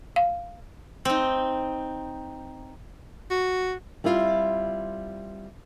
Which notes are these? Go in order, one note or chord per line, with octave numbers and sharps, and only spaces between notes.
F5
C4 D#4
F#4
G3 C4 E4 F4